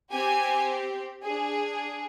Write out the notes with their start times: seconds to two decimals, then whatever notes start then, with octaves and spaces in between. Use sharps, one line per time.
0.12 C4 G4 G#5
1.24 D4 G#4